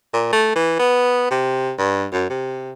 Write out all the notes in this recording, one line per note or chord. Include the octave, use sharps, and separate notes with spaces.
A#2
A3
E3
B3
C3
G2
F#2
C3